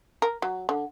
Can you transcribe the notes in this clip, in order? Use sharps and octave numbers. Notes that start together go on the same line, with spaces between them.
A#4
F#3
D3